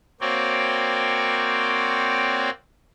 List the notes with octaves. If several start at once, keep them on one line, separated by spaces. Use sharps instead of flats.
A#3 C4 F#4 C#5 D5 G5